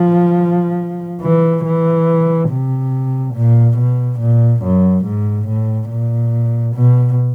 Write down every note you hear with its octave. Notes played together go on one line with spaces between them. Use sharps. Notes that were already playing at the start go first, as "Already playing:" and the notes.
Already playing: F3
E3
E3
C3
A#2
B2
A#2
F#2
G#2
A2
A#2
B2